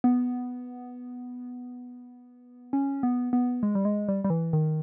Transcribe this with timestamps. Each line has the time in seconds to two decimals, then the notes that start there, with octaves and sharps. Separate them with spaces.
0.04 B3
2.73 C#4
3.03 B3
3.33 B3
3.63 G#3
3.75 G3
3.85 G#3
4.08 G3
4.25 G3
4.30 E3
4.53 D#3